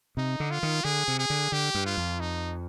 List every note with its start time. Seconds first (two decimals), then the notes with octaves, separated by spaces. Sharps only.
0.17 C3 D#4
0.40 D3
0.51 F4
0.63 D#3
0.84 D3 G#4
1.08 C3
1.19 G#4
1.30 D3
1.52 D3 G4
1.75 G2
1.86 F4
1.97 F2
2.20 D#4